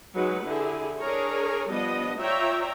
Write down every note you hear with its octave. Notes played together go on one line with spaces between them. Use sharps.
F#3 G#3 D#4 B4 F#5
D3 E4 G4 G#4
D4 G#4 A#4 C#5
F3 G3 B3 D4 D#5
F4 C#5 D5 E5 G5 A#5